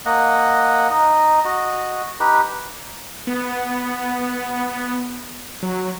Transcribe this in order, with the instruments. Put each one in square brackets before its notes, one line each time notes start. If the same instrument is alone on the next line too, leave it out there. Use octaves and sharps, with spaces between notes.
[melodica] A#3 D#5 F#5
D#4 D#5
F#4 D#5
D#4 G4 B4
[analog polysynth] B3
F#3